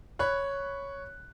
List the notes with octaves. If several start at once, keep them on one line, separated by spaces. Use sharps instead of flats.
C#5 B5 F#6